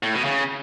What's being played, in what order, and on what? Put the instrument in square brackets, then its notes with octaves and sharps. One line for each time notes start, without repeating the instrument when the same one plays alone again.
[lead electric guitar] A2
B2
C#3